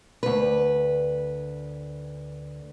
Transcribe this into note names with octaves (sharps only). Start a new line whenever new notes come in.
D2 B4